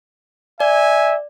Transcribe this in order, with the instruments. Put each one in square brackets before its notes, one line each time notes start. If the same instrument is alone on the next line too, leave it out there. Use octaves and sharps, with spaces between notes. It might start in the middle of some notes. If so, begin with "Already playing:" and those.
[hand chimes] D5 [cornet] E5 [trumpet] G#5